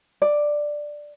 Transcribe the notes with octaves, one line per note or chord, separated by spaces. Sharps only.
D5